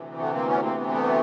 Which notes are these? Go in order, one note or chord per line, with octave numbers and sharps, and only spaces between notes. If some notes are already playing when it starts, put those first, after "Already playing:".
Already playing: D2 C3 E3
A3 B3
A#3 C4
B3 C#4
A#3 C4
B3
C4
A3 B3